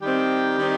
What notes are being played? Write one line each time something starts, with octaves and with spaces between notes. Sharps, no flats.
D#3 G3 C4 D#4 G4
D#3 G3 C4 D#4